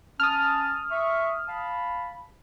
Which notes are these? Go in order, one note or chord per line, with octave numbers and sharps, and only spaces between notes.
C#4 A5 D#6 F6
E5 C#6
F5 A5 B5